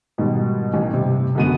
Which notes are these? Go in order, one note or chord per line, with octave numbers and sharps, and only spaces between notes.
G#2 B2 D#3 G3
A1
G2 C3
F#2 D3 G#3 B3 F#4 D#7